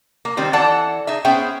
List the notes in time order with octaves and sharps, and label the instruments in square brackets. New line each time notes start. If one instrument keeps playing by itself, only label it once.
[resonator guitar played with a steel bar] A#3
D#3 G3 C4 C5
E3 A4 D5 F#5 A5
D#4 G#4 E5
B3 C#4 G#4 C5 E5 G5